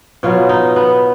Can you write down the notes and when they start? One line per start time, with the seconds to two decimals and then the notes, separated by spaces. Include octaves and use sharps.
0.23 B2 F#3 B3 F4
0.49 D#4
0.76 B3